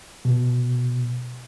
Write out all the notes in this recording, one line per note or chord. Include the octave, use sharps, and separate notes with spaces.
B2